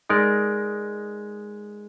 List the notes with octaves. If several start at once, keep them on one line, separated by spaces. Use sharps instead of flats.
G#3 D#4 A#4 D5